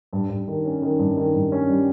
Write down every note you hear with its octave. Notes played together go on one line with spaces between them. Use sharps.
G2
G2
D#3
C#4
D#3
G2
D#3
G2
C#4
G3